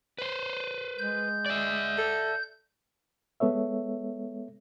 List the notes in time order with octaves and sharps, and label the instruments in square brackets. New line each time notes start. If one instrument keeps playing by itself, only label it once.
[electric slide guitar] B4 C5
[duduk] G#3 [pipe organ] G6
[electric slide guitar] D5 E5
[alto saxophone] A4
[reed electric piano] G#3 B3 A4 C#5 E5